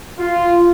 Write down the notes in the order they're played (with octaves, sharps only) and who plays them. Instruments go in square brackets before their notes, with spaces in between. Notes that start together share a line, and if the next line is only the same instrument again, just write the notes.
[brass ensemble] F4